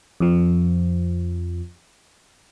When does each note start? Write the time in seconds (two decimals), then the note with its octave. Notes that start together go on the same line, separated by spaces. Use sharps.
0.20 F2 F3